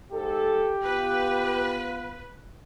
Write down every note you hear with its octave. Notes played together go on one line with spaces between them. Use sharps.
G#2 G4 A4
B3 F4 B4